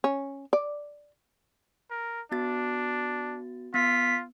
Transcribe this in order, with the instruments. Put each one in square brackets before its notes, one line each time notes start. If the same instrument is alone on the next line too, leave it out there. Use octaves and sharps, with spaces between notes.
[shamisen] C#4
D5
[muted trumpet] A#4
[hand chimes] B3 F#4 A6 [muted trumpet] D4
[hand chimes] B3 [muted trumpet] F4 [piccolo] B6